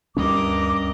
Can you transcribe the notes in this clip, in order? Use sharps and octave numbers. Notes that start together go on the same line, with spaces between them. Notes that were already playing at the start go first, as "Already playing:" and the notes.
D2 G2 G3 C#4 A#4 D#5 D6